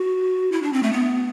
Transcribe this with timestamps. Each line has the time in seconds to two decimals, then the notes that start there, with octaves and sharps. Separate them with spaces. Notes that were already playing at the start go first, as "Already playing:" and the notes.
Already playing: F#4
0.52 E4
0.62 D4
0.73 C4
0.83 A3
0.92 B3